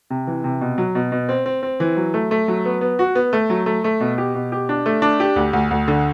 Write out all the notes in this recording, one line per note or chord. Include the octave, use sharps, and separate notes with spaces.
C3
E3
C3
B2
F#3
B2
B2
C4
C4
C4
E3
F#3
A3
A3
F#3
B3
B3
F#4
B3
A3
F#3
A3
A3
B2
G4
B2
G4
D4
A3
D4
G4
D2
D2
D2
D3